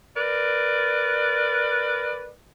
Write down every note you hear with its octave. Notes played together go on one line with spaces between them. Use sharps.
A#4 B4 D5